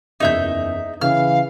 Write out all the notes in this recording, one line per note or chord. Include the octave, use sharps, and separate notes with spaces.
F#1 E2 D#4 E5 G6
C#3 E3 F5 F6